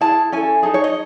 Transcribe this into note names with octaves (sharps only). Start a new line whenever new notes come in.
E4 G#4 A5
C#4 E4 A4 G#5
D#4 G#4 A5
C#5
D#5